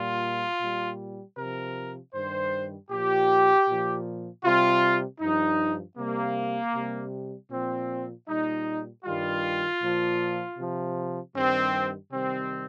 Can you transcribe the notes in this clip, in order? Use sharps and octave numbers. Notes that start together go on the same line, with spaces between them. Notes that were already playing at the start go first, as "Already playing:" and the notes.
Already playing: A#2 G3 F4
A#2 G3
C3 F3 A#4
G2 D#3 G3 C5
A#2 F3 G4
A#2 F3
C3 G3 F4
G2 F3 D#4
C3 G3 A#3
C3 G3
A#2 F3 C4
A#2 G3 D#4
G2 D#3 G3 F4
A#2 F3
C3 F3
G2 D#3 G3 C4
C3 D#3 G3 C4